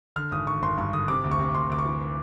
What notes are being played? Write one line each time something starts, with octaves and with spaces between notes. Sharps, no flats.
D3 F6
G#1 D#6
D3 C#6
G#1 C6
G2 C#6
D3 D#6
C3 D6
D2
C#6
C3
D2 C6
D2 D6
C#6
E3